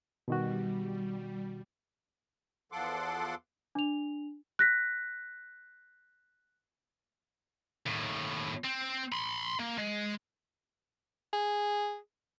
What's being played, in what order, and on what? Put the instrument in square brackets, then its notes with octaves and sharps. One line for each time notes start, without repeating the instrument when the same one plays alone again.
[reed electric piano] B2 D#3 F#4 [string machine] G3
[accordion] E2 F3 A4 F#5 C6 D6
[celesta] D4 F7
F#6 A#6 B6
[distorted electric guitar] D#2 A2
C4
B5 C6
A#3
G#3
[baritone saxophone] G#4